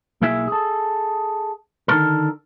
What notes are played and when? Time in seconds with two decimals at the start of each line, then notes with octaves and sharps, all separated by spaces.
0.22 B1 A#3 E4 G#4 E5
0.48 G#4 A4
1.88 D3 D#3 F#3 A#3 A4 A#4